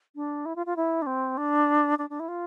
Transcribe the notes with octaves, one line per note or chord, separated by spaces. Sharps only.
D4
E4
F4
F4
E4
D4
C4
D4
D4
D4
E4
F4